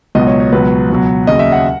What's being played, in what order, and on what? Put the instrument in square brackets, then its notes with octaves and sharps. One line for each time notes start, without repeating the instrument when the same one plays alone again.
[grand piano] C#2 B2 F#3 D#5
C#5
C#5
C#2 B2 F#3 B4
C#2 B2 F#3
D#2 C#3 F#3 D#5
E5
F#5